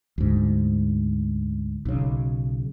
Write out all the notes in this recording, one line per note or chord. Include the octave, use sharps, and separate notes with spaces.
D2 G#2
B1 C#3